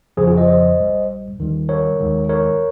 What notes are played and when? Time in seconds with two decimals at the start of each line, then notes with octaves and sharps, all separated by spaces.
0.17 G1 F2 C#3 F3 G#4 C5
0.27 F4 G#4
0.37 C5 D#5
0.48 C5 D#5
0.78 A#1 A#2 G3
1.38 D#2 D#3 G3
1.69 A#4 C#5
1.99 D#2 D#3 G#3
2.29 A#4 C#5